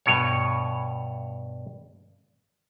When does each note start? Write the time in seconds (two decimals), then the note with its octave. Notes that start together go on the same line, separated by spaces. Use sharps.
0.06 G2 B2 C#5